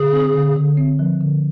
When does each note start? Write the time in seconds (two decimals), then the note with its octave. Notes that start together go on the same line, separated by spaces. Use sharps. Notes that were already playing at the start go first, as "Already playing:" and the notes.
Already playing: D3 G#4
0.13 C4
0.34 D3
0.56 D3
0.77 C4
0.99 F3
1.21 D3